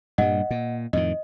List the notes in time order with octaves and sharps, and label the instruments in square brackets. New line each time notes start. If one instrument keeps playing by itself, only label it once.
[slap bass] G2 A#2 G3 [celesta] D#5 F#5
[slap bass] A#2
[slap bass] F2 A2 D#3 [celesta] D#5